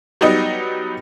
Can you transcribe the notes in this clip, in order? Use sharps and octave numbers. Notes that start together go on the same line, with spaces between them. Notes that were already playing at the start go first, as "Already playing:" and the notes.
F#3 G3 B3 D#4 D#5